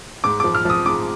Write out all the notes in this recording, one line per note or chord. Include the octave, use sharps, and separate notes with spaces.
G#2 D6
F3 D6
F6
F3 D#6
G#2 D6